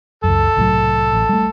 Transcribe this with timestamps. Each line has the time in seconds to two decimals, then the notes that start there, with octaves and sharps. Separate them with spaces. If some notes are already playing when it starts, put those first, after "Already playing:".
0.24 C#2 F#2 A4
0.57 C2 A2 F#3
1.13 A1
1.29 G3 A3